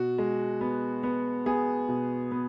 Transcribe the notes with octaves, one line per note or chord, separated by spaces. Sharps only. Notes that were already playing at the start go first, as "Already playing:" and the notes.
Already playing: B2 F#4
G#3
B3
B3
B3 G#4
B2
B3